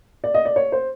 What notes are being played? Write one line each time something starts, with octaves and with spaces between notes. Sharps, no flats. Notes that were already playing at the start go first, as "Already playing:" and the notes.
D5
D#5
D5
C#5
C5